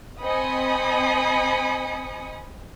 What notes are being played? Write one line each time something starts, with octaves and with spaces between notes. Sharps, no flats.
C4 D#5 G#5 B5 D#6 C#7